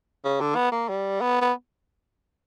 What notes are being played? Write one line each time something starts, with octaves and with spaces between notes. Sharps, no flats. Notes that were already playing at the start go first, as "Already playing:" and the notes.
C#3
D3
B3
A#3
G3
B3
B3